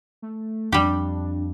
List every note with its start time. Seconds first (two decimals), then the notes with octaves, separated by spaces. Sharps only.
0.22 A3
0.72 F2 G3 D4 G4